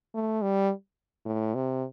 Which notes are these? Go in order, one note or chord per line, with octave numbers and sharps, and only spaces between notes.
A3
G3
A2
C3